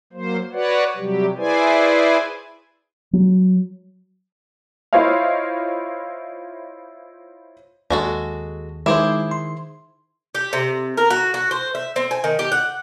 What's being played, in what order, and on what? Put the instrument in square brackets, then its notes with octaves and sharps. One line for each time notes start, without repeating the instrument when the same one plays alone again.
[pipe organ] F#3 A#3 C5
F#4 B4 C#5 D5 F#5
C3 F#3 G3 G4
E4 G#4 B4 C5 D5 G#5
[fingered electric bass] F#3
[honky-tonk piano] E4 F4 C5 C#5 D#5 F5
[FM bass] D#2 [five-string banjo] G#3 F#4 A4
[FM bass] D#3 [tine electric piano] G#3 D#4 D6 [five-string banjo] E4 G#4 C5
[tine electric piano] C6
[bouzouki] G4
C3
A#4
F#4
F#4
C5
E5
C4
G#5
D#3
G4
F#5